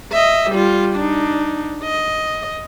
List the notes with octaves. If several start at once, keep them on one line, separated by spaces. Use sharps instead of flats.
D#5 E5
G3 F4
D4 D#4
D#5